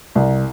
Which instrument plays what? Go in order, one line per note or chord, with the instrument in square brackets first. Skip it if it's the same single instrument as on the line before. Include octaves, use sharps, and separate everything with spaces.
[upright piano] C2